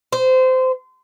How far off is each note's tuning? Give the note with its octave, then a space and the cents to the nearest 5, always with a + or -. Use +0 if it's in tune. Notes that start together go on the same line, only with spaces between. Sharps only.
C5 -20